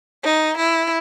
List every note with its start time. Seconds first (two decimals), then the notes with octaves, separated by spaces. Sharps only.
0.24 D#4
0.58 E4